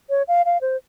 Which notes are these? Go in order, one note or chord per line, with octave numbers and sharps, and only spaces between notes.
C#5
F5
F5
C5